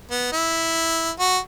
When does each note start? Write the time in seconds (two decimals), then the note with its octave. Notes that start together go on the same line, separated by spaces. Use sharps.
0.11 B3
0.32 E4
1.19 F#4